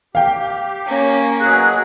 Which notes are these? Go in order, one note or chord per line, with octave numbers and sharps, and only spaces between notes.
G4 F5 G5
A#3 C#4
B2 F#3 G#4 F#6